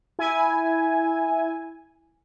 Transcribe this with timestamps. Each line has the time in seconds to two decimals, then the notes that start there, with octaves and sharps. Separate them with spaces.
0.19 E4 G#5